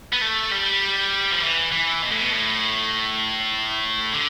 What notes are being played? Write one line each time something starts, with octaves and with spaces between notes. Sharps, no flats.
B3
A3
G3
F3
E3
E3
B2
A2
B2
A2
D3